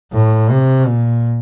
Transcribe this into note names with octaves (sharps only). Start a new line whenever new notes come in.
A2
C3
A#2